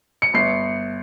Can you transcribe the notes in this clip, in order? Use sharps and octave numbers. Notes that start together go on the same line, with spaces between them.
C#7
G1 C7